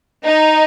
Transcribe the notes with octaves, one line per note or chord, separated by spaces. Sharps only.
D#4